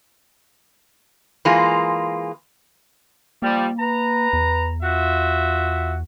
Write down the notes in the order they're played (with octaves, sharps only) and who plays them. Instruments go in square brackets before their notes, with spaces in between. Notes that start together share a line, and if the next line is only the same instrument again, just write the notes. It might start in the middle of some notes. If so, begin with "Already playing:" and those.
[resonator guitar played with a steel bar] E3 G#3 A#3 F4 G#4
[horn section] F3 G3 [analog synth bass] A#3
[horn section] B4 A#5
[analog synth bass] E2
[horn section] F4 F#4 E5